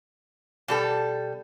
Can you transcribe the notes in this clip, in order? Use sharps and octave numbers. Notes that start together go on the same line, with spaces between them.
B2 G3 A4